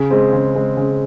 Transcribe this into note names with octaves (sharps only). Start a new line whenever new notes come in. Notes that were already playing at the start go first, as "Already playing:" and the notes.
Already playing: C#3
G#3 C4
C#3
G#3 C4
C#3